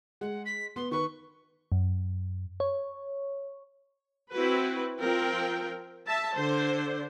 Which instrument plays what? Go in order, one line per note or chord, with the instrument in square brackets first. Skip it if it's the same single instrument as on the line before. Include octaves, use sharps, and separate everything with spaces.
[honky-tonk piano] G#3 [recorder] F#5
[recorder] B6
[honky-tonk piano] B3 [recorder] C6
[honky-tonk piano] D#3 B4 [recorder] C#6
[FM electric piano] F#2
C#5
[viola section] C4 E4 F#4 B4
F3 C4 A#4 G5
E5 A5
D3 C5